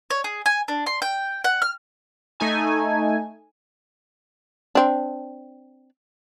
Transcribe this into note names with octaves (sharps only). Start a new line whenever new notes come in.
C#5
G#4
G#5
D4
C6
G5
F#5
F6
A3 D#4 G#5
C4 D4